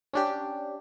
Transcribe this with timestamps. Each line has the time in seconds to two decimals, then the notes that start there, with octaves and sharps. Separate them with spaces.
0.13 C#4 D4 G4